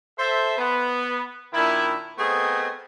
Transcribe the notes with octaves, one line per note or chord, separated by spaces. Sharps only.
A4 C5 E5
B3
A#2 D#3 D4 E4
A3 B3 C4 G#4 A#4 D#5